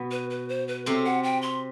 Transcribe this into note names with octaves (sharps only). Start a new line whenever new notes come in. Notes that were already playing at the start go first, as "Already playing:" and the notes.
Already playing: B2 B3
B4
B4
C5
B4
C3 C4 A4
F#5
G5
C6